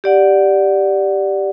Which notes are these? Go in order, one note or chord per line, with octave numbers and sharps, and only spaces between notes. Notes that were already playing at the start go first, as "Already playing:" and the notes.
G4 D5 F#5